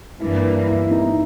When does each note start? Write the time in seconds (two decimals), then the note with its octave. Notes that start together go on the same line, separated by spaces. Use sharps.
0.20 G2 E3 A#3 E4
0.44 E4
0.67 E4
0.91 D#4